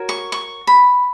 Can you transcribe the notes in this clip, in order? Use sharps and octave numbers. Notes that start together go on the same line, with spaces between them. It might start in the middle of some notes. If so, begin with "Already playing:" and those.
Already playing: F#4 A#4 C#5
C#6
C#6
B5